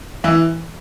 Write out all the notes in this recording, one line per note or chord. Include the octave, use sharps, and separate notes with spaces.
E3 E5